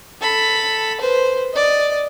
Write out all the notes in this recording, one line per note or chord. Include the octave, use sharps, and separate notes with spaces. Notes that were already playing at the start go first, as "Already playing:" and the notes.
A4 B5
B4 C5
D5 D#5